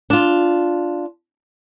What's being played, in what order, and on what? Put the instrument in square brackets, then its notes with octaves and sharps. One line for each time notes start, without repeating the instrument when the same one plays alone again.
[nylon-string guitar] D4 F4